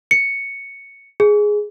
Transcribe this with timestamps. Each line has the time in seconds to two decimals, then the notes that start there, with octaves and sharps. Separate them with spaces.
0.11 C#7
1.20 G#4